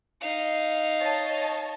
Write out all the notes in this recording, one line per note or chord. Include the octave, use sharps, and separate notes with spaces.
D#4 F5
C#5 D#5 A5